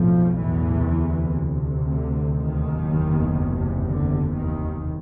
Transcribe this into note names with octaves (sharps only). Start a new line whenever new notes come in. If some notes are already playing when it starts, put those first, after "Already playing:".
Already playing: B1 F2 A2 F3
E2 E3
D2 C3
D3
D#2 D#3
F#1 E2 C3
D3
D#2 D#3